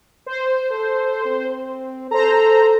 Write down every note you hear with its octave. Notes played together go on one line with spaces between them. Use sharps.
C5
A4
C4
A4 C5 A#5